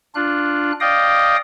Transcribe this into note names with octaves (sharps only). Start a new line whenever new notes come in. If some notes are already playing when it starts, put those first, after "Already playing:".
D4 F4 F#6
D5 D#5 F5 G5 D#6